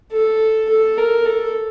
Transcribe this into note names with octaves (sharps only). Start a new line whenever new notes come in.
A4
A4
A#4
A4